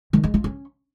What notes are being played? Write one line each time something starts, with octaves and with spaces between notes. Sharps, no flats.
D#3
G#3
F4
C#4